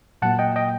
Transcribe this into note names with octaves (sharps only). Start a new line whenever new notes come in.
A#2 F#3 A#3 F#5 A5
D#5 G5
D#5 G5